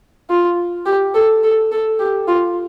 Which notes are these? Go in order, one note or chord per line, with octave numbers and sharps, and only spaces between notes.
F4
G4
A4
A4
A4
G4
F4